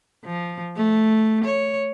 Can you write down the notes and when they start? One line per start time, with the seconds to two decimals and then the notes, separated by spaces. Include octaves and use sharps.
0.25 F3
0.77 A3
1.44 C#5